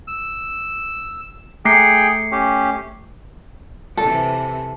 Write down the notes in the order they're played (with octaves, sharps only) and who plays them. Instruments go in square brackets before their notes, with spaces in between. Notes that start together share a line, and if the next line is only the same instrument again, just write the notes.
[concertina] E6
[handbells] A3 C7 C#7 [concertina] G#4 G5
[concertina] C#4 G4
[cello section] C3 E3 [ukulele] A4